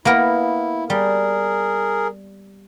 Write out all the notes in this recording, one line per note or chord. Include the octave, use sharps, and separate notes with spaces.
A#3 B3 E4 A#4
G3 G#4 A#4